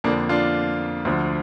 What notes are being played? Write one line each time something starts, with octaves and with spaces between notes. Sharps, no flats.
F2 D3 F3 A#3 D4
D4 F4
D2 D3 F3